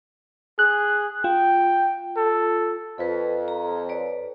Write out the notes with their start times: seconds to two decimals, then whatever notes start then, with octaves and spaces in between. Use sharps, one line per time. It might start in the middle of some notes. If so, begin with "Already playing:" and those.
0.59 G#4 F#6
1.24 F4 G5
2.17 A4
2.98 F2 A4 B4
3.48 A#5
3.89 B4 C#5 D5